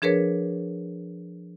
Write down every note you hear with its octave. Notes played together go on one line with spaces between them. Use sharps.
F3 D4 G#4 A#4 B4 C#5